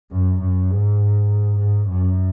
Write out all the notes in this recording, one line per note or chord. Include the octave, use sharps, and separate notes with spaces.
F#2
F#2
G#2
G#2
F#2